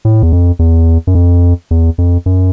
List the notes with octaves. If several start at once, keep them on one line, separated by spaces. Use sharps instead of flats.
A2
E2
F2
E2
F#2
F2
E2
F2
F#2